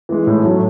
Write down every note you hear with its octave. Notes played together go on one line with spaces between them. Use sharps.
E3 G#3
A2
F#3 A3